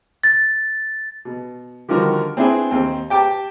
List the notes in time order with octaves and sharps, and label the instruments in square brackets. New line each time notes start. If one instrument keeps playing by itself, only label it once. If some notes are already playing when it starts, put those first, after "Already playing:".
[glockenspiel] A6
[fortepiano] B2
D3 D#3 F3 G3 F#4 A#4
C4 D4 E4 G#4 B4
D#2 C4
G4 G5 A5 D6